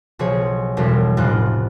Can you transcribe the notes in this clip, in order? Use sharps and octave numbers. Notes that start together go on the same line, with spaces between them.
B1 F3 G#4 C#5
E1 B1 G3
F1 A2 F4 F#6